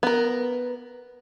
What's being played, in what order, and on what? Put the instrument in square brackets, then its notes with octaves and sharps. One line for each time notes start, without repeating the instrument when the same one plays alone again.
[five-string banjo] B3 A#4